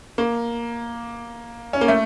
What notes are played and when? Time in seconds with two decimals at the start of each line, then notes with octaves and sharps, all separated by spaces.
0.18 A#3
1.73 C#4
1.81 A#3
1.88 A3